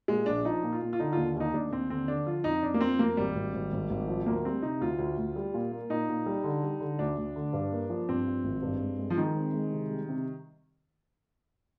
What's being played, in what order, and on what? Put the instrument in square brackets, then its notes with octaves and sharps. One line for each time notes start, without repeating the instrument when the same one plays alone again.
[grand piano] A#2 [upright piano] G#3
[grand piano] A#1 [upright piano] D4
[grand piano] F3 [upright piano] D#4
[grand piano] A#2
[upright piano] F4
[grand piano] A#2
[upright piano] F4
[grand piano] D3 [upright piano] D#4
[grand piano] D#2 [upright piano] F4
[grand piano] D#2 [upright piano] D#4
[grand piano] D#2 [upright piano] D4
[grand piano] D#2 [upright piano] C4
[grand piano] D3 [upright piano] C4
[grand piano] D3 [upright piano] D4
[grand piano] F3 [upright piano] F4
[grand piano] F2 [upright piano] D#4
[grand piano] F2 [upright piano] D4
[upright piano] A#3
[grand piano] F3 [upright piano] C4
[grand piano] F2 [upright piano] A#3
[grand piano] G#1 [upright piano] G3
[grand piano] G#1
G#1
G#1
G#1
F3
[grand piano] D2 [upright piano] A#3
[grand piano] G3 [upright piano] C4
[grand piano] C3 [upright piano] D#4
[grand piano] D2 [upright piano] F4
[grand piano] D2
D2
G3
A#2
A#3
[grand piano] A#2 [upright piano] D#4
[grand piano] A#2
G3
D3
G3
D3
[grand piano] D2 [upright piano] D4
[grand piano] D2
D3
G2
A#3
F3
[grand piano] G2 [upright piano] C4
[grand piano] F3
G#1
G2
G#3
G#3
[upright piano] F3
[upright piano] D#3 [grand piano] G#3
[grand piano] C4
G#3
C3
G3
C3